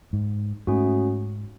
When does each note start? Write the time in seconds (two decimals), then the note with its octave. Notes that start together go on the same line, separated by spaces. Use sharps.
0.13 G#2
0.67 G#2 A3 C#4 F#4